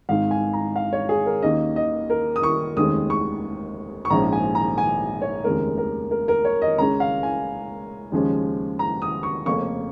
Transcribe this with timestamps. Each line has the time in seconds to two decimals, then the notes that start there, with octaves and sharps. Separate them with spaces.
0.09 G#1 G#2 D#3 G#3 F5
0.31 G#5
0.53 A#5
0.76 F5
0.93 C#5
1.09 G#4
1.26 A#4
1.42 D#2 D#3 A#3 C#4 D#5
1.76 D#5
2.10 A#4
2.36 D#6
2.43 C#6
2.76 F1 D#2 D#3 G#3 C#4 D#6
3.10 C#6
4.05 C#6
4.10 A#1 G#2 F3 C#4 A#5
4.33 G#5
4.55 A#5
4.78 G#5
5.22 C#5
5.44 F1 D#2 C#3 G#3 A#4
5.78 A#4
6.11 A#4
6.28 A#4
6.45 C#5
6.62 D#5
6.78 C#2 C#3 G#3 C#4 A#5
7.00 F5
7.23 G#5
8.12 D#2 C#3 F3 G#3 C#4
8.79 A#5
9.02 D#6
9.23 C#6
9.46 F1 F2 C#3 A#3 C#4 C#6